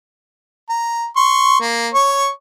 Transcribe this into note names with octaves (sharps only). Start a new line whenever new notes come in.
A#5
C6 C#6
A#3
C#5 C#6